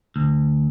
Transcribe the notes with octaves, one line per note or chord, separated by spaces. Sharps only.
D2